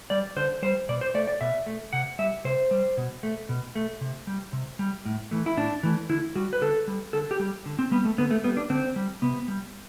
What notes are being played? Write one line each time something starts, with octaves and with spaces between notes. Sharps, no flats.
G3 D5
D3 C5
G3 C5
B2 D5
C5
A3 D5
D5
B2 E5
A3
C3 F#5
G3 E5
C3 C5
G3
B2
A3
B2
A3
C3
G3
C3
G3
A2
E3 A3
E4
A2 D4
E3 A3
D3 E4
G3 F#4
B4
D3 A4
G3
D3 A4
G4
G3
D3
C4
G3 B3
A3
D3 B3
A3
G3 B3
D4
D3 C4
G3
C3 B3
G3